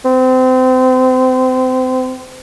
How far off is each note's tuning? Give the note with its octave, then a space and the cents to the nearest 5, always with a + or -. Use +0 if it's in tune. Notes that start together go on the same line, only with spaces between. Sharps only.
C4 -30